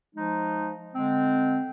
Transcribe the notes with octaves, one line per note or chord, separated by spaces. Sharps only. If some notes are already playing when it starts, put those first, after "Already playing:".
F3 G#3 D#4
D3 G#3 C4